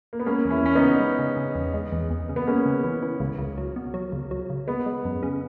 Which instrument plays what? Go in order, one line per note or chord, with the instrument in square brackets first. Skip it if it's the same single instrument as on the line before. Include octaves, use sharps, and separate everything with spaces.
[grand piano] A#3
B3
[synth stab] G#3 [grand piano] A#3 C#4
[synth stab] E2
[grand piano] C#4 E4
[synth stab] E2 [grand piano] C#4
[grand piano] B3 D#4
[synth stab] C#3
G#3
C#3
C#3
E2
G#3
E2
E2
C#3
[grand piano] B3
[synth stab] G#3 [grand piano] A#3 C#4
[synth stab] C#3
E3
E3
C#2
C#2
F#3
B2
F#3
C#2
F#3
C#2
[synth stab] G#3 [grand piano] B3
[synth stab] G#3
F#2
C#3